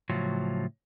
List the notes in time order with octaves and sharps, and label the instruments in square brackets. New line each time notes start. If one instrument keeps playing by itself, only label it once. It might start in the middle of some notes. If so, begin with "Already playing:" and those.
[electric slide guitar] A2 C#3 F3 F#3